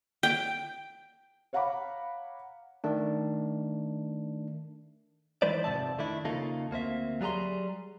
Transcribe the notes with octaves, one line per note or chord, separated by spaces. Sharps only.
G5
C#5 F5 F#5 A#5 B5 D6
D#3 A3 D4
D#3 E3 G#3 B4 C5 D5
F2 G#2 C3 D5 E5 A5
D#3 A3 D4 E4
F2 C#3 A#3 D#4 F4 A4
D2 A#3 C4 E5
F#3 G3 G#4 A#5 C6